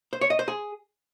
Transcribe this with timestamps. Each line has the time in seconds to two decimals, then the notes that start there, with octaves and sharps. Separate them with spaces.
0.13 C5
0.21 C#5
0.30 D#5
0.39 C5
0.48 G#4